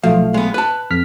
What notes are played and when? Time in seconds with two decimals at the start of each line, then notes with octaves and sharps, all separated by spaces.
0.04 B1 F3 A3 F5
0.34 G#3 B3
0.54 B4 A5 F#6
0.90 F2 F6 B6